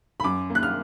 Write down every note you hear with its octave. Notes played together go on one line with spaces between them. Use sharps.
B5
F#2 D6
A#3
F#6
F6